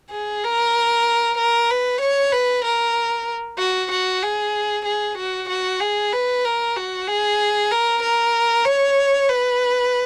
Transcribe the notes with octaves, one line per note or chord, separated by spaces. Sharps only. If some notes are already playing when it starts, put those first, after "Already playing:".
G#4
A#4
A#4
B4
C#5
B4
A#4
F#4
F#4
G#4
G#4
F#4
F#4
G#4
B4
A#4
F#4
G#4
A#4
A#4
C#5
B4